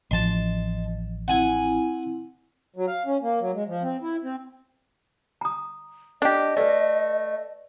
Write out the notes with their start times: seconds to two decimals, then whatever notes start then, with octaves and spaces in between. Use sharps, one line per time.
0.11 A1 F3 D#5 A5 C6
1.28 C4 E4 F#5 G#5
2.76 F#3
2.87 F5
3.06 C#4
3.22 A#3
3.40 F#3
3.54 G#3
3.68 F3
3.83 C4
4.02 E4
4.24 C4
5.41 A#5 D#6
6.22 D4 G4 D#5
6.57 A3 B4 D5